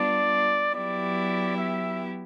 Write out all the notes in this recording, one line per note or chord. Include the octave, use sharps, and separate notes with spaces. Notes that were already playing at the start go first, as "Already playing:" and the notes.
Already playing: G3 B3 D4 F4 D5
F#3 B3 E4 G4 D5
E5